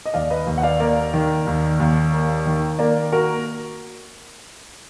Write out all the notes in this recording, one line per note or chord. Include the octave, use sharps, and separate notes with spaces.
D#5
D#2 D5 F5
B4 D#5
D#2
F#5
D5 F5
A#3 A#4 D5
D#3
D#2
D#2
A#3
D#3
A#3 A#4 D5
F#4 A#4